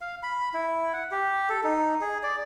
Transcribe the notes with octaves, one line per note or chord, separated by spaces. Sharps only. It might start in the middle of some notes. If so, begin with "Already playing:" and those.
F5
B5
E4
F#5
G4
A4
D#4
G#4
D5